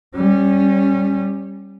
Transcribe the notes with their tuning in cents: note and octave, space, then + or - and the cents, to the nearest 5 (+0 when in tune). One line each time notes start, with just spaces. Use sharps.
G3 +0 C#4 -20